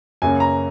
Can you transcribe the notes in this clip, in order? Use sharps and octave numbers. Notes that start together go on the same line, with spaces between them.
F#2 C#3 F#3 A#3 G#5
A#5